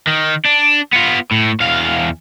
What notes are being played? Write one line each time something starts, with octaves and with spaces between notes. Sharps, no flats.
D#3
D4
B3 F4
A2
E2 F5